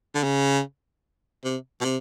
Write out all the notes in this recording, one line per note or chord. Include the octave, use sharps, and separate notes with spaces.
D3
C#3
C3
B2
C3